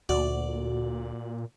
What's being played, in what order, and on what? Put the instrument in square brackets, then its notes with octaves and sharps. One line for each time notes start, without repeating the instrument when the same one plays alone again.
[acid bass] D2 [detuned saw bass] A#2 [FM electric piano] F#4 [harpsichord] D5